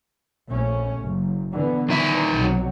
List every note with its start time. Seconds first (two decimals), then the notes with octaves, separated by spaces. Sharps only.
0.49 A#1 A3 C#4
1.01 F#1
1.53 D3 E3 B3
1.89 D#3 E3 D#4 E5
2.37 B1 C3 F#3